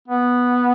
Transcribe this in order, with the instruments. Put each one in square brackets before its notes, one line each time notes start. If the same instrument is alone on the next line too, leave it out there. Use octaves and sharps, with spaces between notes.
[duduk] B3